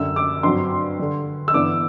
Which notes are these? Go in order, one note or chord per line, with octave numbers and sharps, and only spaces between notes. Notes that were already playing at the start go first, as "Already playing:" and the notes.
Already playing: F#2 D3 G3 E6
D6
G2 F#3 C4 C6
D3 G3 D4
E6
G2 E3 B3 D4 D6